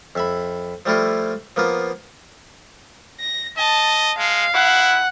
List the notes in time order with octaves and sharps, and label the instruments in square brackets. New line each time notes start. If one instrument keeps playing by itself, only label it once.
[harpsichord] F2 E5 B5
F3 G3 A3 E4 F4
F3 A#3 B3 F4
[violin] A#6
[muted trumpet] D#5 [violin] A5
[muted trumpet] G#3 [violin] F5
[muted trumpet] E4 [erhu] F#5